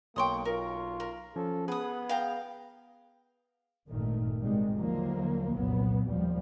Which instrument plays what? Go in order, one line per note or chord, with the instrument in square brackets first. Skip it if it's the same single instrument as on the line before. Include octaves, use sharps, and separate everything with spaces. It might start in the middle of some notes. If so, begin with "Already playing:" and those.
[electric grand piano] B1 C#5 C#6 [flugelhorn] A#3 [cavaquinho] G5 C6 D#6
[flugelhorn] F4 [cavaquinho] A#4
[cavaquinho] A#4
[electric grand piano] F3 C#4 [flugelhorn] A4
[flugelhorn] B3 [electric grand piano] G#4 [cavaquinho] B4 D#6
[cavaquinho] F5 G5 A#5
[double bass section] G#1 G2 A#2 D#3 A3
G#2 C3 D#3 G3 G#3
D#2 D3 D#3 F3 F#3 A#3
F1 C2 F#2 A#2 F#3 B3
D#2 B2 F3 G3